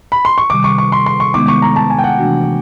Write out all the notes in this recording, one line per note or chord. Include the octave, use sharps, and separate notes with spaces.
B5
C6
C#6
C3 D#3 G3 D6
C#6
C#6
C6
C6
C#6
C3 D#3 G#3 B3 D#4 D6
C#6
A#5
A5
G#5
G5
F#5
C3 E3 A3 D4 F#4